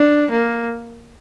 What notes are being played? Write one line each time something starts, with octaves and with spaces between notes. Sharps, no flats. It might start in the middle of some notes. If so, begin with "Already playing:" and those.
Already playing: D4
A#3